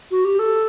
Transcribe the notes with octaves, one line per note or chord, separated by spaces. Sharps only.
F#4
G4
A4